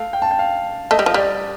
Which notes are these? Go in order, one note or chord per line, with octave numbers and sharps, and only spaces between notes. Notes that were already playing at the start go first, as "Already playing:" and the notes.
Already playing: A3 F5
G5
A5
G5
F5
A3 D#5
G3
F3
G3 D5